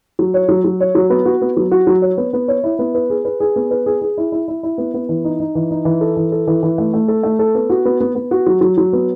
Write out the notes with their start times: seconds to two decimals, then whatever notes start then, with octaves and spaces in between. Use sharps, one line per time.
0.19 F#3
0.34 C#5
0.49 F#3
0.64 F#3
0.80 C#5
0.95 F#3
1.10 B3
1.25 F#4
1.41 B3
1.57 F#3
1.71 F#4
1.87 F#3
2.02 C#5
2.17 B3
2.33 B3
2.48 C#5
2.64 E4
2.79 B3
2.95 B4
3.10 G#4
3.25 B4
3.40 G#4
3.56 B3
3.71 B4
3.86 G#4
4.01 G#4
4.17 E4
4.32 E4
4.48 E4
4.63 E4
4.78 B3
4.94 B3
5.09 E3
5.25 D#4
5.39 D#4
5.55 E3
5.71 D#4
5.85 E3
6.01 A4
6.17 E3
6.32 A4
6.47 E3
6.63 E3
6.78 A3
6.94 A3
7.08 A4
7.23 A3
7.39 A4
7.55 B3
7.70 F#4
7.85 B3
8.00 B3
8.15 B3
8.31 F#4
8.46 F#3
8.61 F#3
8.77 F#3
8.93 B3